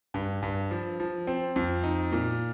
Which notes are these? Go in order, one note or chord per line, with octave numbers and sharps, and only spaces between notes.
G2
G2
F3
F3
C4
F2
D#4
A#2